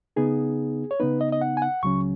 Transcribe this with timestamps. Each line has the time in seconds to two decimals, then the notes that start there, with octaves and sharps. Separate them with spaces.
0.16 C#3 B3 D#4 G#4
0.91 C#5
1.00 C#3 B3 D#4 B4
1.21 D#5
1.32 D#5
1.41 F#5
1.57 G#5
1.62 F#5
1.83 C#2 C#3 F#3 C#4 C#6